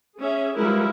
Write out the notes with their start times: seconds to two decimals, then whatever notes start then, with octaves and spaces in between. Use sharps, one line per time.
0.19 C#4 G#4 E5
0.58 F3 G3 G#3 E4 A#4 B4